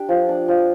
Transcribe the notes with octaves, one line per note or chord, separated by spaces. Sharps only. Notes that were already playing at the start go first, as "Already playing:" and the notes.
Already playing: D4 G4
F3
D4
F3